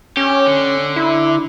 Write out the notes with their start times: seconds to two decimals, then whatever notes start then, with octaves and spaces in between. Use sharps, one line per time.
0.17 C#4 G4
0.47 D3
0.96 E4